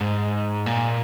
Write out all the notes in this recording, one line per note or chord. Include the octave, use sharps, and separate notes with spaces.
G#2
A#2